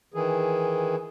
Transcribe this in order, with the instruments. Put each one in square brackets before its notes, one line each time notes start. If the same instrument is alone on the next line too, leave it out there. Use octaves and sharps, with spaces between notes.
[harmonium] D#3 E3 G#4